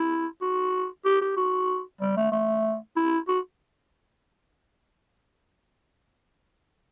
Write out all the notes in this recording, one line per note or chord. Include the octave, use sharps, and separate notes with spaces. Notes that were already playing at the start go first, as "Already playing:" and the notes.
Already playing: E4
F#4
G4
G4
F#4
G3
A3
A3
E4
F#4